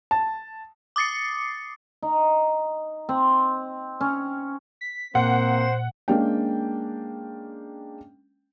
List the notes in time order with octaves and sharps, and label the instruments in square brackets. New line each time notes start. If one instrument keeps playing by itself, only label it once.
[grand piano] A5
[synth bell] D6 D#6 A6 C7 C#7
[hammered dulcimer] D#4
C4
C#4
[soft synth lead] B6
[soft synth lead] A#2 [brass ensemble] A#3 C4 [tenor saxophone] C5 [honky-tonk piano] F#5
[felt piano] G#3 A#3 C#4 D4 G5